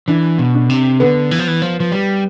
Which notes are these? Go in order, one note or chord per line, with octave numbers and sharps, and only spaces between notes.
E3 D4
B2
D4
C3
D3 B3
E3
F3
E3
F3
F3
G3